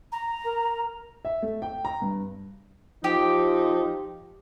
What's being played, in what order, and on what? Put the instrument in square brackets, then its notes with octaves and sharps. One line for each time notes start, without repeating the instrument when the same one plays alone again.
[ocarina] A#5
[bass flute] A#4
[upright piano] E5
A3
G5
A#5
G2
[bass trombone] F3 [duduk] D#4 [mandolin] G4